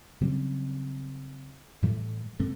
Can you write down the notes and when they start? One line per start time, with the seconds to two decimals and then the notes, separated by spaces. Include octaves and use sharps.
0.21 C#3 F#3 G3 C4
1.82 A2 E3 G3 A3
2.40 C3 A3